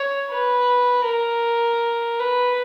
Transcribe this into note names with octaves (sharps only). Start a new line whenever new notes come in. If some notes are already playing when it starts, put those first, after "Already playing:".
Already playing: C#5
B4
A#4
B4